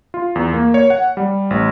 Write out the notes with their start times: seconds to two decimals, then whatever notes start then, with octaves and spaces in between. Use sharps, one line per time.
0.14 F4
0.35 E2
0.53 A#3
0.74 C#5
0.90 F#5
1.17 G3
1.50 A1